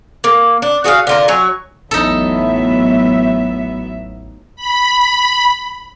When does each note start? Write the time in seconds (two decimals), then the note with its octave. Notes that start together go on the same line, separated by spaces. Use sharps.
0.24 A#3
0.62 D4
0.84 F#4 G#4 D5 F5
1.07 D3 F4 A#4
1.28 F#3 C#5 G#5
1.91 A1 E2 A2 F#3 B3 D#4 A4 E5
4.56 B5